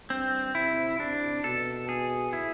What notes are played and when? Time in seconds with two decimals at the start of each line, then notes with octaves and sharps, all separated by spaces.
0.10 G2 C4
0.55 C3 E4
1.00 C3 D4
1.44 B2 A4
1.89 G#4
2.33 E4